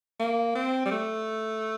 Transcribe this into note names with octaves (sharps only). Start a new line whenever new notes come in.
A#3
C4
G3
A3